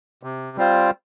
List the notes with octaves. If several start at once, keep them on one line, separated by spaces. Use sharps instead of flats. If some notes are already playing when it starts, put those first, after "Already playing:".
C3
G3 C4 F4 C5